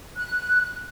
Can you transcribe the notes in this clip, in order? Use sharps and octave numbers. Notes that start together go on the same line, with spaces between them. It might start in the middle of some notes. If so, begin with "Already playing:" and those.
F#6